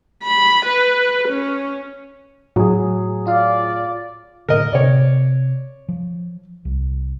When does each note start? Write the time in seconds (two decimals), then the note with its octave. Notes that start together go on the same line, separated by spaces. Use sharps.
0.24 B5
0.66 B4
1.29 C#4
2.56 A2 F#3 G#4
3.27 F4 D5 F5
4.48 A2 D3 A#4 D#5
4.73 C3 C#5 D5
5.89 F3
6.65 C2